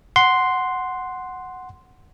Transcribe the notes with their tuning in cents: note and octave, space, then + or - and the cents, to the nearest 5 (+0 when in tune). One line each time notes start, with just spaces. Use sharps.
F#5 +0 C6 +0